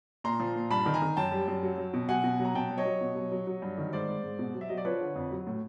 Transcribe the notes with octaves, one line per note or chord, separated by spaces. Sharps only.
A#2 A#5 C6
F3
A#2
G2 A5 B5
D#3
G#5 A#5
D#3
F#2 G5 A5
G3
F#2
F#3
F#3
B2
F#3 F#5 G#5
B2
F#3
A#5
B2 G5 A5
F#3
C#5 D#5
F#3
B2
F#3
F#3
F#3
G2
D#3
G#2 C5 D5
G#2
G#2
B2
F#3
E5
F#3 D#5
D5
F3 B4 C#5
D3
F2
F#3
A2